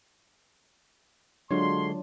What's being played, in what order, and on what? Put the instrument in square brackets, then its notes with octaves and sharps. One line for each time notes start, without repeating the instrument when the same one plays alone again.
[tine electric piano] D3 G#3 C#5 [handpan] F#3 D4 F4 [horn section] C6